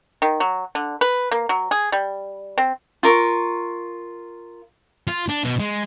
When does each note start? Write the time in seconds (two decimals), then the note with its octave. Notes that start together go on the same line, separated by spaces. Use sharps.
0.22 D#3
0.40 F#3
0.75 D3
1.01 B4
1.31 A#3
1.49 F#3
1.71 G#4
1.92 G3
2.58 C4
3.03 F4 A#4 C#6
5.07 F4
5.28 D4
5.44 B2
5.60 G#3